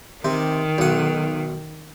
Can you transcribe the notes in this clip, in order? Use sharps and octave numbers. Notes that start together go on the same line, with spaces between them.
C3 D#3
B1 F#5